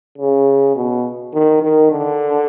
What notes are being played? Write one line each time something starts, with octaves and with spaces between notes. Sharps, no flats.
C#3
B2
D#3
D#3
D3